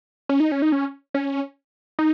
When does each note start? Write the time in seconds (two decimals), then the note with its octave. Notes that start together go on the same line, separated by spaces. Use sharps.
0.29 C#4
0.40 D#4
0.52 C#4
0.62 D#4
0.72 C#4
1.14 C#4
1.99 D#4